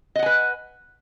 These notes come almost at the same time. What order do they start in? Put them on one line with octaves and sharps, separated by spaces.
D#5 F#5 G#5 B4